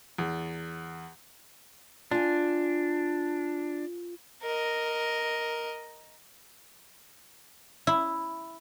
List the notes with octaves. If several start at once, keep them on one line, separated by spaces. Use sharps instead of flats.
E2
D4 F4 G#5
A#4 D#5
E4